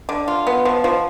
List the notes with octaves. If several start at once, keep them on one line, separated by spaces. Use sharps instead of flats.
D3
F4
B3
F3
F3